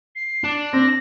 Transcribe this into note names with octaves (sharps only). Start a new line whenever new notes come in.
C7
D4
C4 A#6